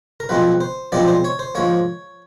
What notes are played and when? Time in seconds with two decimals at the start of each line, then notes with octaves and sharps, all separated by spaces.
0.20 A#4
0.29 B1 A#2 F3 G#3 C4 B4
0.61 C5
0.92 B1 A#2 F3 G#3 C4 D5
1.08 C5
1.24 C#5
1.39 C5
1.55 G#2 F3 A#3 C#5